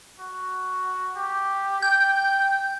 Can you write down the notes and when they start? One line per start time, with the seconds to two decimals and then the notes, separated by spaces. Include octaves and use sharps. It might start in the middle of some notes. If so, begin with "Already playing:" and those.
0.19 F#4
1.16 G4
1.82 G5 G6